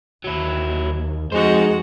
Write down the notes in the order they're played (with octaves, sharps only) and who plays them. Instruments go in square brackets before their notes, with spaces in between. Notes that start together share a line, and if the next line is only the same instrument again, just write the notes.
[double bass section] D#2 [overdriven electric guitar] F#3 E4
[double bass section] F2 [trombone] G#3 [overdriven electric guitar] D#4 C5 [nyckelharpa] F#4 F#5